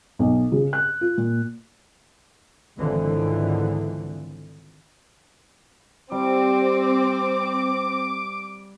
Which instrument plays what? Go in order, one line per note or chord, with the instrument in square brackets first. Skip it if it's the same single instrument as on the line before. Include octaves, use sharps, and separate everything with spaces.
[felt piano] B1
C#3
F#6
F4
A#2
[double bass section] G#1 C#2 D3 E3 F3
[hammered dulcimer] G3 [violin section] C4 [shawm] D6